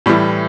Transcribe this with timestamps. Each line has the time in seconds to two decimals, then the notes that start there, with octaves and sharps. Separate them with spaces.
0.06 A2 E3 G3